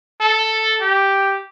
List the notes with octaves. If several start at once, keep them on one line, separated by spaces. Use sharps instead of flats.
A4
G4